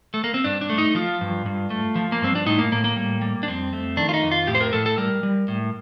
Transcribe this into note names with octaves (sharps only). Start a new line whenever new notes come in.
A3
A#3
C4
G2 D4
D4
A3
D#4
F3 F4
G2
G2
A3
F3
A#3
G2 C4
D4
A2 D#4
A#3
A2 A#3
A#3
G3
G3
D4
F2 C4
A3
D#3 D4
F4
D#4
F2
F4
A2 G4
C5
A#4
A2 A4
A4
G3 A#4
G3
A2